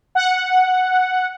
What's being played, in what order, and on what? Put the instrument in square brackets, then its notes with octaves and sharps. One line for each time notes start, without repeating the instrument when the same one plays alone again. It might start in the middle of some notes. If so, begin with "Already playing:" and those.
[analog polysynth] F#5